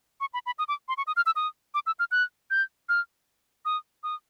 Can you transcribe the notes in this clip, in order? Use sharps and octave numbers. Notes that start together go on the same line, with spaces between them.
C#6
B5
B5
D#6
D6
C6
C#6
D#6
F6
E6
D#6
D6
E6
F6
F#6
G6
F6
D#6
D#6